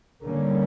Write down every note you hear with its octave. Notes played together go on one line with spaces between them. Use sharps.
D3 G3 A#3 C#4